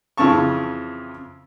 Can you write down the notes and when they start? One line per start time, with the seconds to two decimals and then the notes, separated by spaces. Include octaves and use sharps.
0.17 F2 C#3 E3 A5 C#6